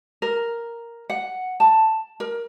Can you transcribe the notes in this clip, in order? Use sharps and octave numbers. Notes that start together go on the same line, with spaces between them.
A#4
F#5
A5
A#4